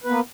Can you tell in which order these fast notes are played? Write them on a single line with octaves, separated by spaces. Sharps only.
B4 B3 A#3